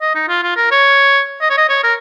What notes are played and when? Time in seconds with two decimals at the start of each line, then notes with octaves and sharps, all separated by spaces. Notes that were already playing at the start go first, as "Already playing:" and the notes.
0.02 D#5
0.15 D#4
0.29 F4
0.43 F4
0.57 A#4
0.71 C#5
1.41 D#5
1.50 C#5
1.58 D#5
1.69 C#5
1.84 A#4